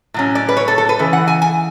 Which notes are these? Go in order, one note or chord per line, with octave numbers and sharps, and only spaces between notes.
A2 F#3 C#4
D5
B4
C#5
A4
A4
B4
C#3 E3
F#5
G#5
G#5